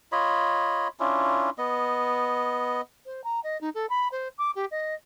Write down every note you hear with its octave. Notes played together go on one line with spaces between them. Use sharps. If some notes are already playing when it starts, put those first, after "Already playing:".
F4 C#5 D#5 B5
C#4 D4 E4 F4
B3 D#5
C5
A#5
D#5
D#4
A4
B5
C5
D6
G4
D#5